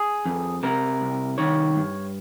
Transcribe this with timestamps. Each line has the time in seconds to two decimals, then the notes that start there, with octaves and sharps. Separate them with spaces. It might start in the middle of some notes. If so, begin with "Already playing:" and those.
Already playing: G#4
0.25 F2
0.63 C3 A#4
1.01 C2
1.38 D#3 C#5
1.76 G2